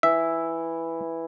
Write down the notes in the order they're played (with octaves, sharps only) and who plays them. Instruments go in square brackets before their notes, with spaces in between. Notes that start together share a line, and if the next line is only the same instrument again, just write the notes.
[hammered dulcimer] E3 E4 [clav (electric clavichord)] E5